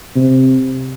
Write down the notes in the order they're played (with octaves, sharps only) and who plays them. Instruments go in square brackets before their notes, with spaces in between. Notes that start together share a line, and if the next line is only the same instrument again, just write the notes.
[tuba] C3